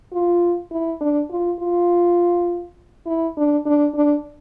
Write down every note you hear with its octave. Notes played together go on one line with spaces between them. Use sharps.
F4
E4
D4
F4
F4
E4
D4
D4
D4